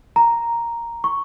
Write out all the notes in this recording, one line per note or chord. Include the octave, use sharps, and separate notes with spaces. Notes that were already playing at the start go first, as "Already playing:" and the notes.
A#5
C#6